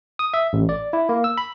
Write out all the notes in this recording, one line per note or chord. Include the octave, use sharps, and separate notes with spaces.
D#6
E5
A1
D5
E4
A#3
E6
B5